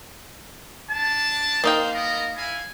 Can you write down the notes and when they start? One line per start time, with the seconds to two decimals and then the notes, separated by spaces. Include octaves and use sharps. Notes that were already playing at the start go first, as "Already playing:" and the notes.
0.90 D4 A5
1.64 A#3 D#4 C5 F5 G5
1.93 B3 A#4 D#5
2.37 E4 F5 G#5